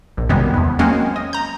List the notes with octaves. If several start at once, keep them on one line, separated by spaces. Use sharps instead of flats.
A#1
F#2 C3 D#3 G3 G#3 B3
E2 B3
F#3 G#3 A#3 C4 C#4 F#4
D#5
A#5 G6